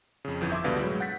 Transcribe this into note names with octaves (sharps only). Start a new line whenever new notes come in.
F2 C#3
G1 F2 E3 G6 G#6
E5 C6 D6 E6
C#2 B2 D3 G3 B4 F5
A2 F#3 G#3 E4
F#5 G6 A6 B6